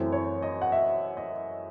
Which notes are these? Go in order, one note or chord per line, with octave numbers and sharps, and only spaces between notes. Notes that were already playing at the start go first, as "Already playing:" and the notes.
Already playing: F#2 E3 A3 C4
C#5
D#5
F#5
E5
D#5